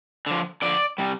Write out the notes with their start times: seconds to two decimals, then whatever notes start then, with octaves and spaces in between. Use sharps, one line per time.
0.26 D3 F3
0.62 D3 F3 D5
0.98 C3 G3